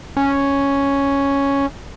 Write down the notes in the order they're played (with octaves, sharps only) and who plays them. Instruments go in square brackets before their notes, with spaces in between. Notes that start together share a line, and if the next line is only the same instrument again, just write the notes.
[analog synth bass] C#4